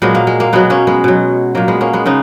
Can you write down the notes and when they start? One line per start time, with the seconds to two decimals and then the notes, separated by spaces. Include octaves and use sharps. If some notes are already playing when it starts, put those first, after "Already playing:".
0.02 A#2 F#3 G#3 B3
0.15 A#3
0.27 G#3
0.40 A#3
0.53 B2 F#3 G#3 B3
0.70 A#3 C#4
0.87 G#3 B3
1.04 B2 F#3
1.55 A#2 F#3 A#3
1.68 G#3 B3
1.81 A#3 C#4
1.93 G#3 B3
2.06 C#3 B3 D#4